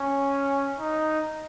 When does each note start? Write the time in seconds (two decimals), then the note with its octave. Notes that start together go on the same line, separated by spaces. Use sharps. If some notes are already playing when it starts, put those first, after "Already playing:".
Already playing: C#4
0.78 D#4